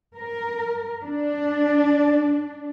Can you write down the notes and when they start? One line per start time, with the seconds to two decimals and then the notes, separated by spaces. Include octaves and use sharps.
0.15 A#4
1.04 D4